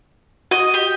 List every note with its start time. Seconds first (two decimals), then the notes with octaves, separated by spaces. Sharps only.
0.51 F#4 D#5
0.74 G4